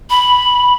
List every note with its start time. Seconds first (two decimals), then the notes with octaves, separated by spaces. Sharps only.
0.10 B5